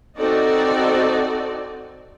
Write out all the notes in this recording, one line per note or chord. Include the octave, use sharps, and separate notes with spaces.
C4 D#4 F#4 A4 D5